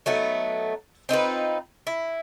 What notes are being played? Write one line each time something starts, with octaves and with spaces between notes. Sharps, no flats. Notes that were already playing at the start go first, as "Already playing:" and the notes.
F#3 A3 B3 D#4
C4 D#4 F4 B4
E4